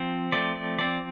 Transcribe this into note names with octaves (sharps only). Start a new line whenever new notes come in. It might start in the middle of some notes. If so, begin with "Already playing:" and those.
Already playing: F3 C4
F3 A3 C4 D5
D5
F3 C4 D5